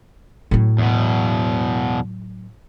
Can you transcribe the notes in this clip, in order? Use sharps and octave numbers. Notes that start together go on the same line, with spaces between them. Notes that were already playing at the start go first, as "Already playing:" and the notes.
A2 F#3
E2 B2